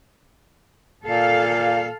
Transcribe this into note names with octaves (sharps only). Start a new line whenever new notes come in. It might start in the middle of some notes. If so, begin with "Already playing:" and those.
A#2 A4 F5